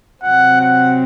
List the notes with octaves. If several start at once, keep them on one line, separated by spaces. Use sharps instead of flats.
C3 F#3 C4 F#5
F#5